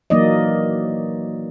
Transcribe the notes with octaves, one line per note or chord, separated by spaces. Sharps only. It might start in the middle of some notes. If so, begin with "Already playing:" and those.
E3 F#3 A#3 D#4 D5 D#5